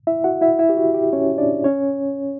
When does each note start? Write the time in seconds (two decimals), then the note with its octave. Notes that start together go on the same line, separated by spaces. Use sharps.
0.07 E4 E5
0.24 F#4 F#5
0.41 E4 E5
0.59 E4 E5
0.69 G4
0.77 F#4
0.94 G4
1.13 C#4 C#5
1.38 D4 D5
1.64 C#4 C#5